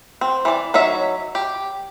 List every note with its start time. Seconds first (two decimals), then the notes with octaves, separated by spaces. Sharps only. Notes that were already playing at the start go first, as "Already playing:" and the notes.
0.21 C4
0.45 E3 D5
0.74 F#3 D#4 C#5 E5
1.35 G4